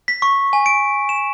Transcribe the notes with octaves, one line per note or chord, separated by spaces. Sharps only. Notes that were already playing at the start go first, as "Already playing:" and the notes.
B6
C#6
G#5
D7
E7